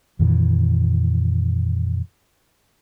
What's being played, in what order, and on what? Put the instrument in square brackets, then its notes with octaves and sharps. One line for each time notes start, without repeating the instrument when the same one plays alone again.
[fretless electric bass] F2 A#2 D#3 E3